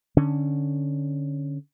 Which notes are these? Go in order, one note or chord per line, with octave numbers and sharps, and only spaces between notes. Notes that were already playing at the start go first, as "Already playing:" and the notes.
D3 C#4